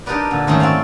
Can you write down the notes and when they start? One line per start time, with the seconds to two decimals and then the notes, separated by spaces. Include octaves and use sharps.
0.06 D4 D#4 G4 A#4 B4 D5
0.31 A#2 D3
0.47 G#2 D#3 A3 C#4 C5
0.60 C4 F#4 D5 F5